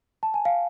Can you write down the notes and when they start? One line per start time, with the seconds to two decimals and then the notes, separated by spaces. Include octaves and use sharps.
0.23 A5
0.34 G#5
0.45 F5